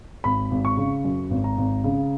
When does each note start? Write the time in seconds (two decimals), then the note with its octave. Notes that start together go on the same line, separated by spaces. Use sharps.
0.24 G#1 B5
0.51 G#1
0.65 C#6
0.77 C#3
1.05 F#2
1.30 G#1
1.44 A#5
1.58 G#1
1.84 C#3